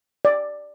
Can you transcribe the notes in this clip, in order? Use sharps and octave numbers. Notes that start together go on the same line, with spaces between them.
D5